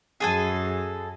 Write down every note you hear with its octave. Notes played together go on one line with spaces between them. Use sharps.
F#2 G#4 A4 G#5